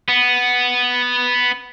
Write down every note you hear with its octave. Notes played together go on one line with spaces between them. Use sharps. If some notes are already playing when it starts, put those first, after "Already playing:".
B3